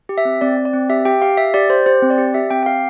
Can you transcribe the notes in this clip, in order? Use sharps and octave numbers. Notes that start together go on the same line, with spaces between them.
G4
E5
C4
C4 D5
C4
D5
C4
G4 E5
G4 G5
G4 F5
G4 E5
G4 D5
G4 C5
G4 C5
C4
D5
G4
G4 E5
C4 G5
G5
G4 F5